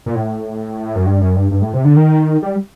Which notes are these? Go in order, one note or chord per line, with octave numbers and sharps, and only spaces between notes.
A#2
A2
F#2
G2
F#2
G2
G2
A2
C3
D3
D#3
G3